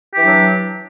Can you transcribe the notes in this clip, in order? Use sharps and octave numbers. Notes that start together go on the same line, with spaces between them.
E3 F#3 D4 G4